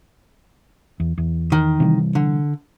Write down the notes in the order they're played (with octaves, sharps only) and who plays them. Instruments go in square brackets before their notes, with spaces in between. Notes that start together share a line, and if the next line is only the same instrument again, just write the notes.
[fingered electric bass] E2
E2
[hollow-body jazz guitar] D#3
[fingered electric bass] C3 E3 G3
[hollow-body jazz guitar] D3